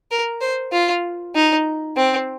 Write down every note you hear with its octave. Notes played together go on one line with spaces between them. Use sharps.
A#4
C5
F4
D#4
C4